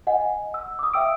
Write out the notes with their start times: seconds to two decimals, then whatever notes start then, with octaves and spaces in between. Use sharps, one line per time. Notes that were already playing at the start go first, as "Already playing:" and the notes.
0.07 D#5 F#5 G#5
0.54 E6
0.79 D6 D#6
0.94 E5 F5 G5 E6 D7